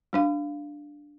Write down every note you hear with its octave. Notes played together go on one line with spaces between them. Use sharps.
G3 D4 F5